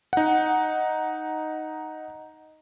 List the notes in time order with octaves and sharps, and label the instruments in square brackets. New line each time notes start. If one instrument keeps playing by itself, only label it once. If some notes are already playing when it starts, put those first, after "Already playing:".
[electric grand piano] D#4 F#5